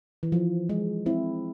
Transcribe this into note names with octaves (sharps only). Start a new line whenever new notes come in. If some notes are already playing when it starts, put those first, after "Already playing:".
E3
F3
G#3
C4 E4